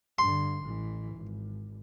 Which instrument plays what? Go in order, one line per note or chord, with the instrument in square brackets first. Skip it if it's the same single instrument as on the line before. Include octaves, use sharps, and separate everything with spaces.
[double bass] G2 D3 [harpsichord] C6
[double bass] A1 E3
G#1